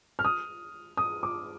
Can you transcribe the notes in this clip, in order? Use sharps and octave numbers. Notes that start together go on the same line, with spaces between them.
F6
D#6
D#6
D6